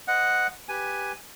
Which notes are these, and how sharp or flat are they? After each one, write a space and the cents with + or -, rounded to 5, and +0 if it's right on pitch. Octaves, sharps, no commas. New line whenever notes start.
C5 -25 D#5 -5 F#5 +0
G4 +0 B4 +0 G#5 +0